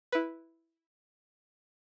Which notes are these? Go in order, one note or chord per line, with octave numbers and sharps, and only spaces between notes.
E4 B4